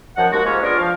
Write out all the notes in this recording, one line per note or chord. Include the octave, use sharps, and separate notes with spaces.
F#2 D#3 F3 F#5
D#2 G#3 F#4
G#2 F3 G#3 A#3 C#4 C#5
B3 D4 F4 G#4 A#4 C#5
F3 F5